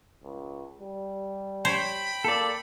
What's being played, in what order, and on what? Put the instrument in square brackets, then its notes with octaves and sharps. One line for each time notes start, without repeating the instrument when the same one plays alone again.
[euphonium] C#2
G3
[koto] C5 C#5 [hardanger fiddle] G5 B5
[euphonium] A#3 [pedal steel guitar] A4 D5